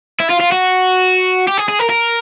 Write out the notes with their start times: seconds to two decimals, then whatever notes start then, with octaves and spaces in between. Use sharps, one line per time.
0.20 E4
0.30 F4
0.40 F4
0.52 F#4
1.48 G4
1.58 G#4
1.69 G#4
1.79 A#4
1.90 A#4